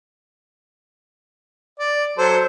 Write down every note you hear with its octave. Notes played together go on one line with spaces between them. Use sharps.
D5
F#3 A4 C5